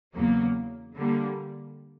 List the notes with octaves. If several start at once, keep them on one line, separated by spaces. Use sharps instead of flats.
E2 C#3 F#3 A#3
D3 G3 A#3